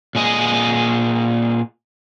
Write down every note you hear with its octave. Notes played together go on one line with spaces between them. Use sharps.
A#2 G#4 D#5